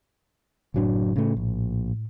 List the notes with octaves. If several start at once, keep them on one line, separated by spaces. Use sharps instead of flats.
F#1 A2 F#3 D4
C#3 A3
A#1